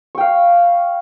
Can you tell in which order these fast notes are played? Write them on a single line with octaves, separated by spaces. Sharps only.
C#6 G5 F5